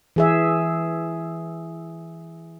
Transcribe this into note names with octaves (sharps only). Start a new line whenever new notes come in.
E3 G#4 E5